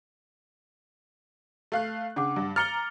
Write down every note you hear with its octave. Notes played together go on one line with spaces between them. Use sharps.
A3 F5 F#6
C#3 D4 F#5 D6
G2
A#5 D6 F6 A6 C#7 G7